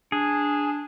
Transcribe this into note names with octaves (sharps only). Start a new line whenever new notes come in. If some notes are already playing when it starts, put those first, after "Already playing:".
D4 G#4